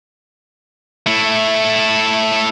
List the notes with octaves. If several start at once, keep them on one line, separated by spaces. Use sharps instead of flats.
A3 E4